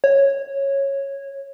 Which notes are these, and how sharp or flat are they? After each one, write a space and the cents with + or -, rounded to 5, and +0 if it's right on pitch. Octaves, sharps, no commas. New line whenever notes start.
C#5 -15